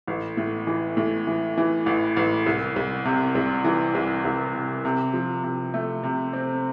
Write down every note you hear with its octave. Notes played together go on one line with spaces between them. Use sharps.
A1
A2
E3
A2
E3
E3
A1
A1
C2
C2
C3
C2
E3
C2
C2
C3
C3
F3
C3
A3
C3
C4